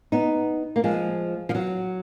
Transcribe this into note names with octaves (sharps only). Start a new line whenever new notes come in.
B3 D#4
A#3
F3 G#3
F3
F#3